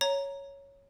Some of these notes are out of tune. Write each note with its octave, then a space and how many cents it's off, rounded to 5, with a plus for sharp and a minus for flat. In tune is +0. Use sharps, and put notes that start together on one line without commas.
C#5 +0 A#5 +0